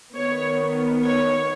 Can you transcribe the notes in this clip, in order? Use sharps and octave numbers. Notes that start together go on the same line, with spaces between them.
D#3 B3 C#5
C#5